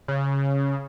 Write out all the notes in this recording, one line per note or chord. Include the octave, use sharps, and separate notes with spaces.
C#3